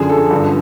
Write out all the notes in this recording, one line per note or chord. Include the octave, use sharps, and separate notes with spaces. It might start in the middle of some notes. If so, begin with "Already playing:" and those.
Already playing: F#2 D3 F3 G#4
A4
G2 D3 F3